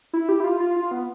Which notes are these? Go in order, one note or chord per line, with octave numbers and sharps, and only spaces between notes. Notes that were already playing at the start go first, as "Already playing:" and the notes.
E4
G4
E4
F4
F4
F4
B3